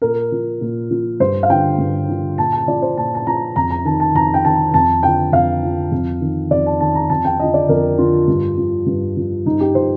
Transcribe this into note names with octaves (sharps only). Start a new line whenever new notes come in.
A#2 A#4
F3
A#2
F3
G2 C5
F5
D3 F3 G5
G2
D3 F3
A#2 A5
A5
F3 D5
C5
A#2 A5
A5
F3 A#5
F2 A#5
A#5
D#3 A5
A5
F2 A#5
G5
D#3 A5
F2 A5
D3 F3 G5
F2 F5
D3 F3
F2
D#3
F2 D5
A5
D#3 A5
A#5
F2 A5
G5
D3 F3 D#5
D5
F2 A#4
D3 F3 F4
G2
F3
G2
F3
G2 D#4
G4
F3 C5